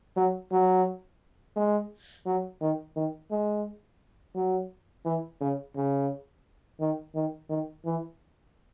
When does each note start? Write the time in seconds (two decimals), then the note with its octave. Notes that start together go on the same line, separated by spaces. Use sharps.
0.17 F#3
0.52 F#3
1.56 G#3
2.26 F#3
2.61 D#3
2.96 D#3
3.31 G#3
4.36 F#3
5.06 E3
5.41 C#3
5.76 C#3
6.81 D#3
7.15 D#3
7.50 D#3
7.86 E3